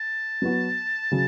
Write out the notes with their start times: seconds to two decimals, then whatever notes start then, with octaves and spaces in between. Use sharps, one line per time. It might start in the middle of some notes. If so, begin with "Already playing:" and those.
Already playing: A5
0.42 F#3 B3 F#4
1.11 C#3 F#3